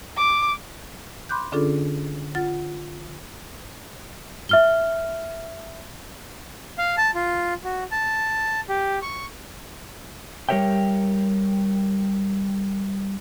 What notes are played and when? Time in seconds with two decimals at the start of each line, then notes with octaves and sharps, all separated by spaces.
0.17 D6
1.29 B5 C6 D6 F#6 G6
1.52 D3 C#4 D4 F4 G#4 A4
2.35 F4 F#5 A6
4.49 E5 F6 G7
6.78 F5
6.97 A5
7.15 F4
7.64 F#4
7.92 A5
8.69 G4
9.02 C#6
10.49 G3 G4 A#4 C#5 E5 G5